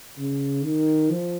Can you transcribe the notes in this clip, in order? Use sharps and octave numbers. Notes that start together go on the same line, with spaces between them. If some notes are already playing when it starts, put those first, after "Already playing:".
C#3
D#3
F3